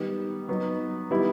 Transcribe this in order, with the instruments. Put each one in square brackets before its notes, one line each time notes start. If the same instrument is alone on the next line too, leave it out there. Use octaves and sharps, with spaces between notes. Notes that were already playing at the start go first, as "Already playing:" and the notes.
Already playing: [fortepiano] D#3 G3 B3
F#3 B3 D#4
D#3 G3 B3 E4